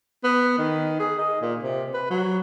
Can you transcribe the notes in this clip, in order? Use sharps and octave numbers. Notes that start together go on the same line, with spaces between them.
B3
D#3
G#4
D#5
A#2
C3
B4
F#3